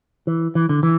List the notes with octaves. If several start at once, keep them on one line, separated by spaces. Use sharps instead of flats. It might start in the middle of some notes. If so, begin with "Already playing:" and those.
E3
E3
D3
E3